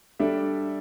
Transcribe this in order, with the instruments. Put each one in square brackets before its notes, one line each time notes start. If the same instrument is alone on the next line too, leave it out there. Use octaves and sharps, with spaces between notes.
[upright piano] G3 D4 A4 E5